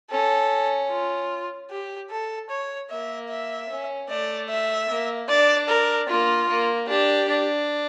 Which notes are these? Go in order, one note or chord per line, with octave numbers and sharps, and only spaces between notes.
C#4 A4
F4
G4
A4
C#5
A#3 E5
E5
C#4
A3 D5
E5
A#3
D4 D5
A#4
A#3 F4
A#3
D4 G4
D4